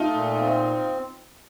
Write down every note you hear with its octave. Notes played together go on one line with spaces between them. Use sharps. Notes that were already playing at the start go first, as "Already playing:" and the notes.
Already playing: A3 D#4 F4
A#2
C4